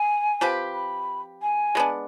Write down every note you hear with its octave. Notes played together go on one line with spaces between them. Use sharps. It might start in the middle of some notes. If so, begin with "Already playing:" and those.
Already playing: G#5
F3 C4 G4 B4
B5
G#5
G#3 B3 D4